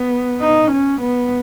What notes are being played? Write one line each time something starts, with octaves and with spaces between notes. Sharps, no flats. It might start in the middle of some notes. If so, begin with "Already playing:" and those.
Already playing: B3
D#4
C#4
B3